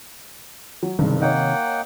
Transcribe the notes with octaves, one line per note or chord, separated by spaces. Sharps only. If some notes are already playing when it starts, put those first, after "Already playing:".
F#3
F#1 G2 C3 D#3
A#3 D#4 C#5 F#5 G5